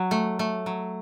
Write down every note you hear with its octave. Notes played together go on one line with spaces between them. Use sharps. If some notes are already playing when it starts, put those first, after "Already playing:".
Already playing: F#3 F#4
A3
A3
F#3